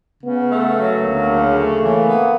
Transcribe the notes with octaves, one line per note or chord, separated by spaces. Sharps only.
C#3 B3
A3
F#3
D2 A#3
C#3
A3
E3 A#3
B3